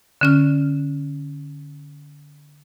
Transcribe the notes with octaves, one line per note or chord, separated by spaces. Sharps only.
D3 C#4 F6